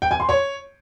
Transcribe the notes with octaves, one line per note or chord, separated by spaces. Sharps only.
G5
G#5
C6
C#5